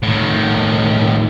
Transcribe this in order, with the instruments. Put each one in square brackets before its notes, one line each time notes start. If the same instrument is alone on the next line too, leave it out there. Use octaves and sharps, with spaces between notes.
[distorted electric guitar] A2 D#3